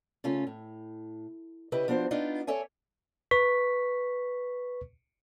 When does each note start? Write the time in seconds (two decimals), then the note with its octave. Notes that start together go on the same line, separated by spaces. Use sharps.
0.24 C#3 A3 C#4 F4
0.47 A2
1.72 C#3 E4 G4 B4 D#5
1.88 F3 B3 D4 F#4 C5
2.11 B3 D4 D#4 F4
2.47 A4 C#5 D5 E5 G#5
3.31 B4 C#6 B6